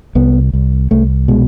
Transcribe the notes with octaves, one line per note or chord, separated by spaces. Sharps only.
C2 B3
C2
C2 A3
B2 G#3